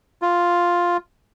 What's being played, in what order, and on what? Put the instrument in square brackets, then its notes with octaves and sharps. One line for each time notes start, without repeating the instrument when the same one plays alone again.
[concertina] F4